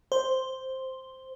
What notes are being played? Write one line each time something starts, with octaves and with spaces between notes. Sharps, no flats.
C5